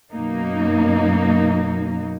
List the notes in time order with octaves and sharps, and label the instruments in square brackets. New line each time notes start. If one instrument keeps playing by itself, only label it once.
[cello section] F#2 B2 A#3 D#4